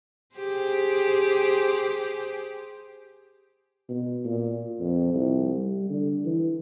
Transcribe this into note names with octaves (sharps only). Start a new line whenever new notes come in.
G4 G#4 C5
B2
A#2
F2
C2
G3
D3
E3